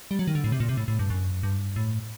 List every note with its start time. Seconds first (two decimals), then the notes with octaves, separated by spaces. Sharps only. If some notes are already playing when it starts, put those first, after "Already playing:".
0.11 G3
0.19 F#3
0.27 D#3
0.35 D3
0.44 A2
0.52 C3
0.60 A#2
0.69 C3
0.77 A2
0.88 A2
0.99 G2
1.10 F#2
1.43 G2
1.76 A2